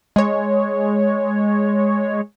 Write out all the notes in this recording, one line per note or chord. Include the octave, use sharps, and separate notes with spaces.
G#3 C#5